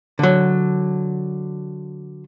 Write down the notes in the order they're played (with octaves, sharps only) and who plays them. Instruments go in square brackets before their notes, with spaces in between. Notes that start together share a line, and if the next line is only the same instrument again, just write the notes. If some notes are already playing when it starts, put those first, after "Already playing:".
[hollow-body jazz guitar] D3 F#3